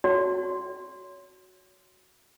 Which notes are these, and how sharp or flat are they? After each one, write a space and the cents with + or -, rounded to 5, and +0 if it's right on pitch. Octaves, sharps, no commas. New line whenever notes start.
F#4 +0 C#5 +20